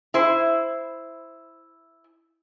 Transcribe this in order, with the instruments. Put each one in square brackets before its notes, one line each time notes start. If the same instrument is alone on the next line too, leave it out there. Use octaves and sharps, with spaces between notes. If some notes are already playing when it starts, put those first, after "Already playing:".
[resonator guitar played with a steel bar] E4 C5